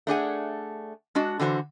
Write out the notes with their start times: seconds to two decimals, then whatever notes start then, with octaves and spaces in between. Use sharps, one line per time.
0.07 A3 D4 G#4 F#5
1.15 G#3 D4 F#4
1.39 D3 E3 F#4 C5